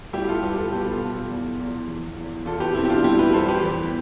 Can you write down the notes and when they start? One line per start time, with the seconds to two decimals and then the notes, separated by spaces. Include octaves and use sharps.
0.13 G3 E4 G4
0.28 F4 A4
0.42 G3 G4 B4
0.57 F4 A4
0.71 B2 G4 B4
0.92 F4 A4
1.00 B2
1.11 F4 A4
1.30 E2
1.60 E2
1.88 E2
2.17 E2
2.46 E2 F4 A4
2.60 G4 B4
2.75 B2 C4 E4
2.85 G4
2.90 D4 F4
3.04 G3 E4 G4
3.19 G4 B4
3.33 E2 A4 C5
3.49 G4 B4
3.63 E2